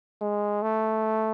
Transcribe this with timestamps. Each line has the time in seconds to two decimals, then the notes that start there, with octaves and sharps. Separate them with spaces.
0.21 G#3
0.62 A3